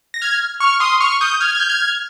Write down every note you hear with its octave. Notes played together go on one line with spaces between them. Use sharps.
A#6
F6 G#6
C#6 F6
C6 D#6
C#6 F6
D#6 G6
F6 G#6
G6
F6 G#6